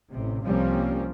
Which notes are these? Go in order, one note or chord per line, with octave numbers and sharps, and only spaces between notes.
A1 C3
C2 F3 G3 A#3 C4 C#4